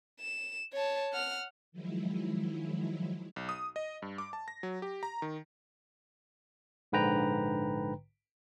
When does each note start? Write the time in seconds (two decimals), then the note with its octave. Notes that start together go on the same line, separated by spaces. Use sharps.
0.20 E7
0.73 C#5 A5
1.13 F#5 F6
1.72 D#3 F3 F#3 G#3 E4
3.36 B1
3.49 D#6
3.76 D#5
4.02 G2
4.18 D6
4.33 A5
4.48 A#6
4.63 F#3
4.82 G4
5.03 A#5
5.22 D#3
6.92 A#1 G#2 D3 B4 G5 A#5